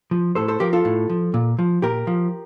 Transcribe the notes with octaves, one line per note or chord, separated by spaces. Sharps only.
F3
A2 A4 C5
A4 C5
F3 G4 A#4
F4 A4
A2
F3
A#2
F3
A#2 G4 A#4
F3